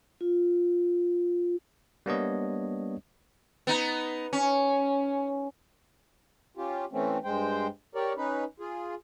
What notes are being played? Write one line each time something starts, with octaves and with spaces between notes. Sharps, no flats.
F4
G3 A#3 B3 D4 C#5 D#5
B3 D#4
C#4
C#4 F4 G4
E3 A3 C4 C#4
G2 G#3 C5 G5
G4 A#4 C#5 D5
C#4 D#4 B4
F4 G#4